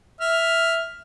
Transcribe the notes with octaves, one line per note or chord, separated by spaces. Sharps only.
E5 F6